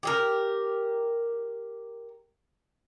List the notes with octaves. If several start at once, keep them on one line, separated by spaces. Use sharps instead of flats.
G4 G#4 A#4